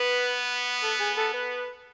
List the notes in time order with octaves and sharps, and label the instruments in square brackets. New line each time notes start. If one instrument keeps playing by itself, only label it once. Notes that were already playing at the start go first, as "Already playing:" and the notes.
Already playing: [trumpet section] B3 [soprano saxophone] B4
[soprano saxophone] A4
G#4
A4
B4